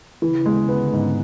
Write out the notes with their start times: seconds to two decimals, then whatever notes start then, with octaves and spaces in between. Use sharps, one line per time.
0.22 C#3 E3
0.46 G#3
0.69 D3 B3
0.92 G#2